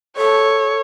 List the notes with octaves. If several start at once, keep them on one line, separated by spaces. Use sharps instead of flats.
A4 C#5